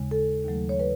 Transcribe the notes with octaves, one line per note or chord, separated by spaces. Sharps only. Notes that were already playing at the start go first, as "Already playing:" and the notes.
Already playing: D#2 C#3 G#3
A4
D#2 D#3 F#3 A3
C#5
B4